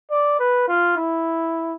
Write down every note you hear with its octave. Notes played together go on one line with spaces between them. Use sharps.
D5
B4
F4
E4